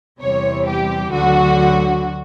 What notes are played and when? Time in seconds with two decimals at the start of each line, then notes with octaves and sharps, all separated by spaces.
0.22 E2 C3 E3 G3 C#5
0.67 G4
1.12 D2 D3 F#3 F#4